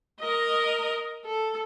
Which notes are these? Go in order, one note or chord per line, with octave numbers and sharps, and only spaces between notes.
A#4 D#5
A4